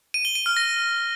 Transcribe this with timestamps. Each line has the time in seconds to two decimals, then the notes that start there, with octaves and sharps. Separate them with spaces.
0.14 D#7
0.25 G7
0.35 D#7
0.46 F6
0.57 A#6